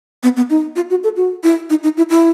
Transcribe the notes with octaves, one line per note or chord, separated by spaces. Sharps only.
B3
B3
D#4
F4
F#4
A4
F#4
E4
D#4
D#4
E4
E4